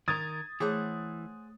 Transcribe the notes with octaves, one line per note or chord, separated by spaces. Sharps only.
D#3 A#4 D#6 G#6 A6
E3 A3 G#4 C5 C#5 F#5 D6